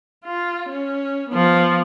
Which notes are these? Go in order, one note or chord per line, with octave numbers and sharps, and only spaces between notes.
F4
C#4
F3 B3